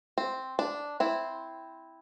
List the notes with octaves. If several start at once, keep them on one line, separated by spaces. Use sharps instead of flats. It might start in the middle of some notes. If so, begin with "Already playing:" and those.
C4
D4
C4 E4